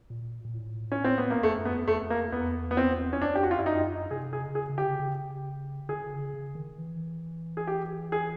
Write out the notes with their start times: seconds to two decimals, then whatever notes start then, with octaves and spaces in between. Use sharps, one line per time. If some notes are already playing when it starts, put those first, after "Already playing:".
0.10 A#2
0.45 A#2
0.54 A2
0.92 C#4
1.04 C4
1.18 B3
1.30 A#3
1.43 F2 A3
1.58 F#2
1.65 B3
1.71 F2
1.88 F2 A3
2.10 A#3
2.32 E2 B3
2.71 B3
2.77 C4
3.13 C#4
3.21 F2 D4
3.35 G4
3.43 F#4
3.51 F4
3.57 G2 E4
3.66 F#2 D#4
4.11 C3 G#4
4.33 G#4
4.40 C#3
4.55 G#4
4.70 C#3
4.78 D3 G4
4.88 C#3
5.00 C#3
5.89 D3 G#4
6.11 C#3
6.34 C#3
6.55 D#3
6.78 E3
7.57 G#4
7.67 G4
8.12 G#4